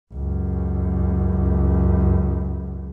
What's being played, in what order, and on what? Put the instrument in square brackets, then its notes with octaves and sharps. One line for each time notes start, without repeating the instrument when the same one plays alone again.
[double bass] C#2 F#2